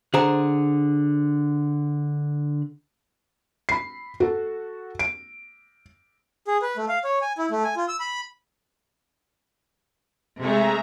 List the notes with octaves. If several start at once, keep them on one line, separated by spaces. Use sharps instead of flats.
D3 G#4 C5 A#5
B5 C7
F#4 A4
D7
G#4
B4
A3
F5
C#5
G#5
E4
A3
G#5
F4
E6
B5
C3 G#3 A3 G#4 E5 A#5